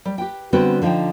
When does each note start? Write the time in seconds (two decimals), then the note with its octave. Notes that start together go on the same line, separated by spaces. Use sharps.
0.05 G3
0.18 G4 B4 G5
0.53 D3 G3 B3 C4 F#4 B4
0.82 D3 F3 D#4 C5 G5